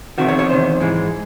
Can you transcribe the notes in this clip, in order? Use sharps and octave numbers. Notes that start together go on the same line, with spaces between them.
E2 C3 D#3 F#4
C#5
C#5
E2 C3 D#3 C5
G#2 E3 G#3